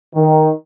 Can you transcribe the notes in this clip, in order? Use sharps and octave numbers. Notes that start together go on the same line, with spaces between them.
D#3